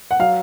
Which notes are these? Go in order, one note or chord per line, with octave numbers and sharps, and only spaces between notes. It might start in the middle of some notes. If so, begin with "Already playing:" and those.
F#5
F#3 F5